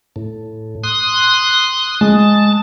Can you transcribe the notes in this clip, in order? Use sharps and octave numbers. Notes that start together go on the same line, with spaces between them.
A2
C6 D#6 F#6
G#3 A5